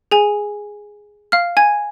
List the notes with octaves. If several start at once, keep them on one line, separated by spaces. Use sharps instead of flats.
G#4 G#5
F5 F6
G#5 G#6